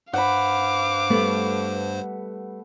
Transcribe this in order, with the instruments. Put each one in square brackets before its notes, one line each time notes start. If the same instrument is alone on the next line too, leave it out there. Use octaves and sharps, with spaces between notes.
[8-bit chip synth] G2 C5 [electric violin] F5 D6 [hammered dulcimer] F#5 B5
[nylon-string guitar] G3 A3 B3